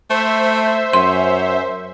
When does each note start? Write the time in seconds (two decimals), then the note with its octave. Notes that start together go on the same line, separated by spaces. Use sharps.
0.10 A3 C5 E5
0.93 F#2 C#4 C6